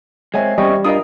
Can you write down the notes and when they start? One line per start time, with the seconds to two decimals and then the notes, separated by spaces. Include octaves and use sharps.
0.34 G#3 C4 C#5 E5 G#5
0.58 E2 G3 C4 C#4 D#5 G5 C#6
0.85 D4 E4 F4 A#4 D#5 D#6